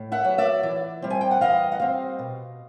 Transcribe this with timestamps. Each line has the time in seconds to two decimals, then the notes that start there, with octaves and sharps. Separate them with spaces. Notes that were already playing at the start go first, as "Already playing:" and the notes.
Already playing: A2
0.12 E5 F#5
0.25 F#3 B3
0.38 D5 E5
0.63 E3
1.02 G3 C4
1.10 G#5
1.21 G5
1.31 F#5
1.41 E3 D#5 F5
1.72 F#5
1.80 G3 C4 D#5 F5
2.19 B2